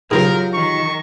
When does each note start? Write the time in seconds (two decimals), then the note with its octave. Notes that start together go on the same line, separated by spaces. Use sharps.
0.11 G#2 C#3 F#3 A#3 F4 G4 G#4 A#4
0.54 D#3 C#6